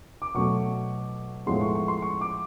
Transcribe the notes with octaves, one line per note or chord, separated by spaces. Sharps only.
D6
B2 F#3 A3 C#6
A2 F3 G#3 B3 C6
C#6
C#6
C6
C#6
D6